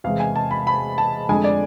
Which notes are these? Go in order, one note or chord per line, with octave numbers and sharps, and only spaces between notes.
E2 C3 G#3 F5
G#5
A5
B5
B5
A5
F2 D3 G#3 G#5
D5